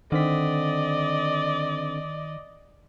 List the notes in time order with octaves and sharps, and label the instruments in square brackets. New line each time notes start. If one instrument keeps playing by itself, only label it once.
[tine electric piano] D3 C4 B6 [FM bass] D#3 [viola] D5 D#5